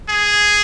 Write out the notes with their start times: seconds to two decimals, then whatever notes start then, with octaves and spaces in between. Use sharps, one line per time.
0.09 G#4